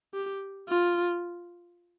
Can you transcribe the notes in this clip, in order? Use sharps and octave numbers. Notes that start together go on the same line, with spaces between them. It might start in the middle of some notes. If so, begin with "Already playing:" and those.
G4
F4